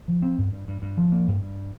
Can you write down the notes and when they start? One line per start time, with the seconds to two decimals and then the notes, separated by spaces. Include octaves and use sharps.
0.08 F3
0.22 C4
0.38 G2
0.52 G2
0.68 G2
0.82 G2
0.97 F3
1.12 A#3
1.28 G2
1.42 G2